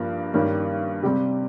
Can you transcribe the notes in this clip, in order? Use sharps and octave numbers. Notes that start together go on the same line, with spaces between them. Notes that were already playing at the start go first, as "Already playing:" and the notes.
Already playing: G2 F3 A#3
G2 D#3 G3 A#3 C#4
C3 G3 C4 G4